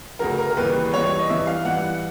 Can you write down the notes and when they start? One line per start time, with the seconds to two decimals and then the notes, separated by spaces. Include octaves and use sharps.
0.19 D2 C#3 F#3 A#4
0.38 A#4
0.50 A#4
0.57 D#2 C#3 E3 G3 B4
0.93 G2 E3 G3 C#5
1.06 C#5
1.19 D#5
1.29 G2 E3 G3 E5
1.47 F5
1.65 G2 E3 G3 F#5